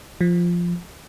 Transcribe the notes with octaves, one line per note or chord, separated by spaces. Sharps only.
F3